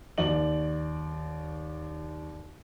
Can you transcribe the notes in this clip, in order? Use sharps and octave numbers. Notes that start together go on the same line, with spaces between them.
D#2 D5 F#7